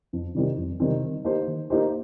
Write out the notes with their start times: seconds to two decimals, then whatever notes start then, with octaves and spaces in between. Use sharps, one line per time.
0.13 F2
0.35 C3 D#3 G3 C4
0.57 F2
0.80 C3 D#3 G3 C4
1.03 D#3
1.25 A#3 D#4 G4 C5
1.47 D#3
1.70 A#3 D#4 G4 C5